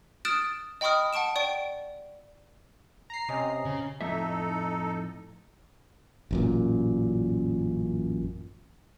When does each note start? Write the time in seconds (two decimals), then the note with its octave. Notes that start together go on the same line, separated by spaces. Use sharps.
0.25 D#6 F6 F#6 A6 D7 E7
0.81 D#5 G5 B5 C#6 D#6 F6
1.13 F#5 A5 C#6 D7 E7
1.36 D5 G5 C#6 D7
3.10 A#5 C7
3.29 C3 C#4 D#5 G#5
3.65 C#3
4.01 F2 A2 D#4 A4 E5
6.31 A1 F#2 A#2